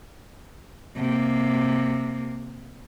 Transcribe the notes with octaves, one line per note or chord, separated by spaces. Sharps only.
C3 A#3